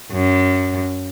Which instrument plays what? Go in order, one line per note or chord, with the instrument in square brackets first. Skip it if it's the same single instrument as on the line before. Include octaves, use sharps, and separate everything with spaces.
[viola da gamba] F#2